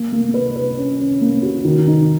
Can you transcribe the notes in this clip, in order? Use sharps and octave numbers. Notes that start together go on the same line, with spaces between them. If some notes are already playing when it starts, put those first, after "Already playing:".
Already playing: A#3
A#3
B4
B4
C#4
C#4
A#3
F#4
D#3
D#4